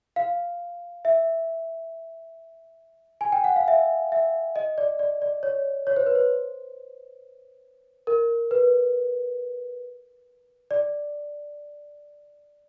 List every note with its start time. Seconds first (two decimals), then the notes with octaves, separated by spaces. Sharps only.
0.16 F5
1.05 E5
3.21 G#5
3.32 G5
3.44 F#5
3.56 F5
3.68 E5
4.12 E5
4.56 D#5
4.78 D5
4.99 D5
5.22 D5
5.43 C#5
5.87 C#5
5.96 C5
6.06 B4
6.15 C5
8.07 A#4
8.51 B4
10.71 D5